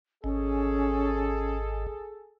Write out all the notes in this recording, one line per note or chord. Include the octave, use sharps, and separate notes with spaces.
G#1 C#4 G#4 A4